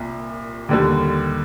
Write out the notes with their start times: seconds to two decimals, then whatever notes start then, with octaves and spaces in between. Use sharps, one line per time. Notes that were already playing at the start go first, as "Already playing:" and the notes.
Already playing: C2 A#2
0.69 D#2 D3 G3